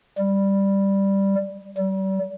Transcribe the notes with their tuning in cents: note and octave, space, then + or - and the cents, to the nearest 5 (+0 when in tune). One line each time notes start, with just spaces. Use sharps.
G3 +5
G3 -35